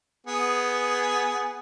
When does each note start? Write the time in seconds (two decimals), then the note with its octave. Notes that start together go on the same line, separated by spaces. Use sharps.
0.27 B3 G#4